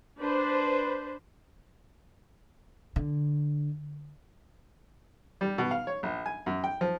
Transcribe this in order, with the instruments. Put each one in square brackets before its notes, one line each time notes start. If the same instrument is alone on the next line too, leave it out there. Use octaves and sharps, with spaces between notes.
[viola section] D4 B4 C5
[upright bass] D3
[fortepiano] G3
B2
F5
C#5
A#1
G#5
F#2
G5
F3